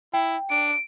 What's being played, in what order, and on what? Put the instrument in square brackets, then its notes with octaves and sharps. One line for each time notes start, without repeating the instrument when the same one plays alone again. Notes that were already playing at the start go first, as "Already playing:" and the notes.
[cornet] E4 [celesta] G5
[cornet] D4 [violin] D7